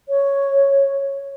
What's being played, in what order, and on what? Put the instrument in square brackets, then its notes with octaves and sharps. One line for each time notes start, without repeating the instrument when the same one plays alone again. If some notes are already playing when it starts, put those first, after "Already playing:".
[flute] C#5